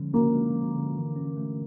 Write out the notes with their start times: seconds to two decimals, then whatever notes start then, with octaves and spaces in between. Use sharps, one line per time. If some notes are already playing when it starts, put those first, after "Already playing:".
Already playing: D3 F3 G#3 C#4
0.13 A#3 C#4
0.34 G#3
0.54 F3
0.75 D3
0.96 E3
1.16 C#4
1.37 A3